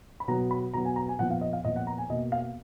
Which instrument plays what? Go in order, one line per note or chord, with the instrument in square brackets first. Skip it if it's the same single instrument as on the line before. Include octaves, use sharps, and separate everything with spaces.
[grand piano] B5
B2 F#3 B3 A#5
B5
B2 F#3 B3 A#5
G#5
A#5
G#5
A#2 F3 B3 F#5
F5
D#5
F5
A#2 F3 B3 D#5
F#5
A#5
G#5
B2 A#3 D#5
F5